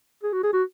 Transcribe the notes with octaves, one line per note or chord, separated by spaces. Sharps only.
G#4
F#4
G#4
F#4